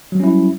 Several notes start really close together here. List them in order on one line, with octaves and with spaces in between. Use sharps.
F#3 G3 C#4 E4